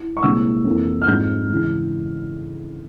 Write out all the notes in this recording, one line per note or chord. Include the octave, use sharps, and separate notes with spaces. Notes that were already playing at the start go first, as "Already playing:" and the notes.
Already playing: E4
C#6
C2 A#2 G#3 C4 E6
F2 E3 A#3
F6
G#2 F3 G#3 C4 F4 G6
C#3 E3 G#3